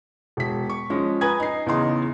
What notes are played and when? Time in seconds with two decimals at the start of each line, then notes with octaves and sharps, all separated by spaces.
0.37 E1 B6
0.69 C#6
0.90 F3 G#3 C#4
1.21 B4 G#5 A#5 D#6 G#6
1.40 D#4 C7
1.66 E2 C#3 D#4 C6